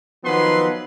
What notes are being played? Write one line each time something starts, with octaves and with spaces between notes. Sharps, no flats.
D#3 F3 F#3 B3 B4 C6